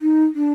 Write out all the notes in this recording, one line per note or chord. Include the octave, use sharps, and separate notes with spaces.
D#4
D4